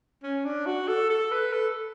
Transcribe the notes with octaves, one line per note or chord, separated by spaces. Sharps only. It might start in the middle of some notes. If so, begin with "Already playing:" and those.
C#4
D4
F#4
A4
A4
B4
A4